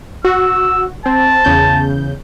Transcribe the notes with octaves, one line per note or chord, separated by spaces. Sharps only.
F#4 E6
C4 A5
E2 C#3 G6